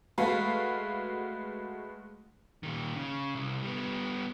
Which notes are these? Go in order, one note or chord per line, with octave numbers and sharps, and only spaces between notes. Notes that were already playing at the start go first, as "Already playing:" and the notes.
G#3 A3 F#4 B4 F5
A#2 D#3
C#3
C2
G3 B3